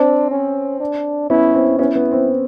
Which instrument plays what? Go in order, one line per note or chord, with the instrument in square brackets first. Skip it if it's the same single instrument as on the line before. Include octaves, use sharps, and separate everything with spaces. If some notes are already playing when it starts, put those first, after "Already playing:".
Already playing: [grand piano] C4 [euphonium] D4
[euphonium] C#4
D4
[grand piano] B3 C#4 [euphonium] E4
[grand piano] C4
[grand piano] B3 C#4 [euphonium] E4
[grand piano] B3
C4